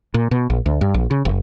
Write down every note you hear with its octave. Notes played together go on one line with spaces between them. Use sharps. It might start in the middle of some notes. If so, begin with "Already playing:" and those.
A#2
B2
A#1
D2
G2
A#1
C#3
F#1